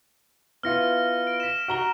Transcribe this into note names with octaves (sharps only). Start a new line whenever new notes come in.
B3 E4 F4 F6 A#6 C#7
D7
B6 E7
F#4 A#5 G7